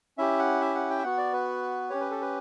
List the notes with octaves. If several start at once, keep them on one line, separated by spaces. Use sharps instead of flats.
C#4 E4 G4 E5
F#5
E5
F#5
G5
E5
B3 F#4 F#5
D5
B4
C#4 G4 C#5
B4
A4
B4